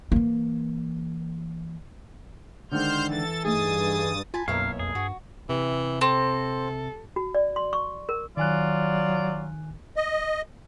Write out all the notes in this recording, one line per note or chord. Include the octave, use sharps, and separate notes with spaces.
E3 A#3
D3 D#3 G#3 C5 F6 G6
E3 A4 A6
G2 A3 D#4 G#4 D#6 A6
F4 G#5 A5 B5
B1 F#2 A#3 E4 A#4 C#5 F5
F2 G#4
G2 F#4
C3 E3
C4 A4
F#4
D5
C6
C#6
A#4
D#3 F#3 F4 D5 G#5 F#6
D#5